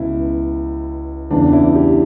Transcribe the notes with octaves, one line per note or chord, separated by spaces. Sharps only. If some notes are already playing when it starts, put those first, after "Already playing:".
Already playing: C#2 B2 E4
E2 C#3 E3 D4
E4
G4